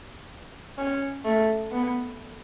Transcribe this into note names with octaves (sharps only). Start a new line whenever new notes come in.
C#4
A3
B3